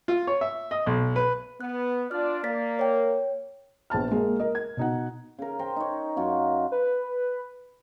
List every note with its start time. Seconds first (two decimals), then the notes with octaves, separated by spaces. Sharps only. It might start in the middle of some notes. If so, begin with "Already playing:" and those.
0.08 F4
0.27 C#5
0.41 E5
0.71 D#5
0.86 B1
1.16 B4
1.61 B3 F#6
2.11 D4 F4 D5 F6
2.44 A#3 D5 A6 B6
2.79 C#5 G5
3.90 A#1 B3 A5 F6
4.11 G#3 A#3
4.39 A#4 D#5
4.55 G#6
4.77 B2 D#4 F#5
5.39 C#3 A#4
5.59 C5 G5 A#5 C6
5.76 D#4 C#5
6.17 F#2 F4 F#4
6.72 B4